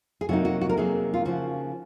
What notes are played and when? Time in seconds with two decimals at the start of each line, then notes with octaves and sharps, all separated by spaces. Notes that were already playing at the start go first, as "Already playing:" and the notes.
0.21 G#4
0.29 C3 F#3 A#3 D#4 F#4
0.45 F#4
0.61 F#4
0.69 A#4
0.77 C3 F#3 A#3 D#4 G#4
1.14 F4
1.25 C#3 F3 A#3 F4 F#4